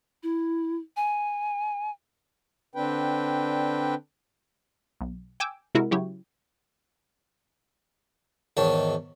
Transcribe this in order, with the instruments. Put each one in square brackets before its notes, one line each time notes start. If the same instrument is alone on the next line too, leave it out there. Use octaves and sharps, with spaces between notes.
[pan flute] E4
G#5
[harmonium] D3 C4 D4 B4 G5
[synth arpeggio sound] B1
G5 G#5 D6 E6
C3 G#3 E4 F#4 A#4
C#3 F#3 E4 G4 C#5
[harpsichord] E2 G#2 D#3 C#5 A5